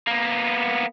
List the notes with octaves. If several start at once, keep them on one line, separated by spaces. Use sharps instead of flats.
A#3 B3